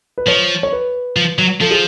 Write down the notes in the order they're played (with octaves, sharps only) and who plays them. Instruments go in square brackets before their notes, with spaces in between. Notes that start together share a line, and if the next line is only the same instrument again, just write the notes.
[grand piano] B4
[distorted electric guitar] F3 [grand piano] C#5
[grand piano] C#5
B4
[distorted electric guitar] F3
F#3
[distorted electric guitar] F3 [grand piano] A4
[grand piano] G#4